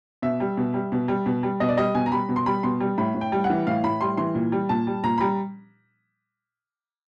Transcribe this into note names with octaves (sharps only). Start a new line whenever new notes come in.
B2 E5
G3
B2
G3
B2
G3
B2
G3
B2 D#5
D5
G3 D#5
B2 G#5
A#5
G3 B5
B2
C6
G3 B5
B2 C6
G3
A2 B5
A2
G5
G3
F#5
E3
A2 F5
A2 B5
G3 C6
E3 C6
A#2
G3
A#2 A5
G3
A#2 A#5
B5
G3 A#5